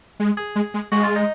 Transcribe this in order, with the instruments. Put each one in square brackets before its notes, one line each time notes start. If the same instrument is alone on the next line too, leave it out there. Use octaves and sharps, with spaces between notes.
[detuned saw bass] G#3
[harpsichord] G#4
[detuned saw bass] G#3
G#3
[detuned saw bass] G#3 [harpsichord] F#4
[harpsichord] F4
D#4